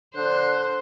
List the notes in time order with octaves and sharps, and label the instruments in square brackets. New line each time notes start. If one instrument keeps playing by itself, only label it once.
[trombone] D3 [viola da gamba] C5 [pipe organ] F#6